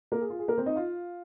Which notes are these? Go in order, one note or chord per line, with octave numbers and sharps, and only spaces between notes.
A#3 A#4
G#4
F4
G#4
A#3 A#4
C4 C5
D#4 D#5
F4 F5